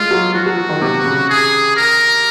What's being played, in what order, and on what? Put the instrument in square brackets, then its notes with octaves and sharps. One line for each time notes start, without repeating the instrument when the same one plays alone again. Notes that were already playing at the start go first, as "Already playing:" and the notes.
Already playing: [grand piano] G#3 [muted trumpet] F4
[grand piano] F#3
[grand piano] F3 [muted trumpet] F#4
[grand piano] F#3
F3
D#3
C3
C#3
[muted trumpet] G#4
A#4